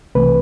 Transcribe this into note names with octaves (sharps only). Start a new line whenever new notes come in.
C2 C3 E3 A3 B4